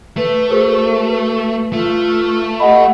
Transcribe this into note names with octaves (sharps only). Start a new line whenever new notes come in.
A3 B4
F#4 G#4 A#4 C5
B4
A3 F4
G4 D#5 F#5 B5